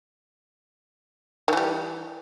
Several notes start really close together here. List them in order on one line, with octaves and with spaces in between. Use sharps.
D#3 E3 G3